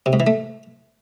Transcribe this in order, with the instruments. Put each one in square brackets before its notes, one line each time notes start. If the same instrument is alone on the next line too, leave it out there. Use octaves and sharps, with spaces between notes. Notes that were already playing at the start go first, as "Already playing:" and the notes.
[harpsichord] C3
G#2
E3
A3